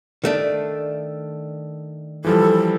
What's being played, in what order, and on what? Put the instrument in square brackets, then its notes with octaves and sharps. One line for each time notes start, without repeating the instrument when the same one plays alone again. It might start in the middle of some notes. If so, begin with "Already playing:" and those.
[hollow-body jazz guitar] D#3 A3 D4
[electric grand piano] E3 F3 G3 [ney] A4